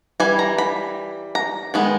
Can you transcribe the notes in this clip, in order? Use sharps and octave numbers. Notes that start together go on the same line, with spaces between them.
E3 G3 G#5
A#5
B5
A#5
D#3 G#3 B3